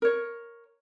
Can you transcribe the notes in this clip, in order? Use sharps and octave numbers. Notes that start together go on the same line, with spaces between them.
A#4 C#5